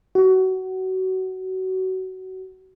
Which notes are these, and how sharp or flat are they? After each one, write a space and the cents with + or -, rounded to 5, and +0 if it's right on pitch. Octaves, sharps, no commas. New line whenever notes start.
F#4 +25